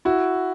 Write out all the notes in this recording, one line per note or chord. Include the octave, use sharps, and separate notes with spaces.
E4 F#4